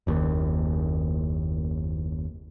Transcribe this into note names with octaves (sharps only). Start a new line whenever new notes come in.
F#1 D#2